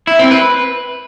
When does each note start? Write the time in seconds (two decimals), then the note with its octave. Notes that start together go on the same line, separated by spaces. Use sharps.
0.07 E4
0.19 C4
0.31 B4